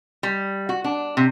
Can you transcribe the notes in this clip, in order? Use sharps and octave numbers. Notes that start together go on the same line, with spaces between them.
G3
F#4
D4
C3